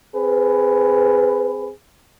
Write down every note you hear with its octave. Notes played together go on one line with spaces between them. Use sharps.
C4 G#4 B4